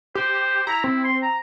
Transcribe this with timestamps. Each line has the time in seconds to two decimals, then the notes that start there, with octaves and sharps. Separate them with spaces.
0.15 G4 C5
0.67 E4 A#5
0.84 C4
1.04 C6
1.23 A#5